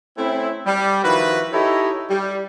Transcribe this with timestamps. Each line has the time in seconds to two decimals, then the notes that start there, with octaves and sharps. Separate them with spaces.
0.18 A3 C4 C#4 E4
0.66 G3
1.04 D#3 F3 E4 F#4 B4
1.53 D#4 E4 G4 A4 C#5 D#5
2.10 G3